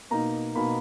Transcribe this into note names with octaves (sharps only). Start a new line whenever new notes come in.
B2 A#3 D#4 A#5
B2 A#3 D#4 B5